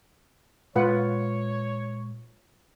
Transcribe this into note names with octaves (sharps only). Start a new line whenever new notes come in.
A#2 G#3 F4 B4 C#5 F#5